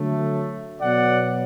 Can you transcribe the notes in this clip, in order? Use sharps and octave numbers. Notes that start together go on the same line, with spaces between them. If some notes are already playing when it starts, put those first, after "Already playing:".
Already playing: D3 F#3 A3
B2 F#3 B3 D5 F#5